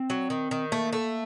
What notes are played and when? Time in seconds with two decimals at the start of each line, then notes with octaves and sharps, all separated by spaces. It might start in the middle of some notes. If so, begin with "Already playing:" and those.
Already playing: C4
0.10 F#3
0.30 D#3
0.51 D#3
0.72 A3 A#3
0.93 A3